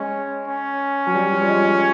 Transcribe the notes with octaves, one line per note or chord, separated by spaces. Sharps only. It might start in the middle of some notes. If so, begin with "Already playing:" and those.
Already playing: G#3 C#4
C#4
F#3
G3
F3
G3
G#3
G#3